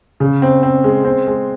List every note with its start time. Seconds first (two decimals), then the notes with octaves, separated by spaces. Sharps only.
0.20 C#3
0.42 C4
0.63 C4
0.84 G#3
1.05 C4
1.27 G#3